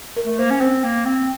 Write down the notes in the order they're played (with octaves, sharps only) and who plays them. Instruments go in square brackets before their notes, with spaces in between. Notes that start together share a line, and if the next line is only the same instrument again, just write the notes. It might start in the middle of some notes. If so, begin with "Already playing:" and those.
[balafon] A#4
[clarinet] A3
[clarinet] A#3 [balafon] C5
[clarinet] C#4
[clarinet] C4 [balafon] C5
[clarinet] A#3
C4